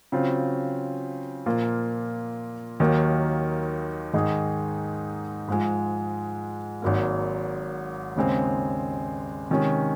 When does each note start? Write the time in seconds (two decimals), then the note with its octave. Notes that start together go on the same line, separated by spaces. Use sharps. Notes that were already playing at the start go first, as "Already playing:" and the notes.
0.12 C#3 F#3 C4 F4
1.46 A#2 F3 A#3 F4
2.80 D#2 D#3 F#3 A#3 D#4
4.13 G#2 D#3 G#3 D#4 G#4
5.48 G#2 F3 G#3
6.82 G#1 G#2 F#3 A#3
8.16 D#2 C#3 G#3 C4
9.50 C3 D#3 G#3 C#4